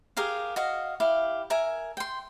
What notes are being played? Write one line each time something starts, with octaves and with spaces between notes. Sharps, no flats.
G4 G#4 A#4 F5
F#4 D#5 F5
E4 G4 F5
A#4 E5 G#5
G5 C6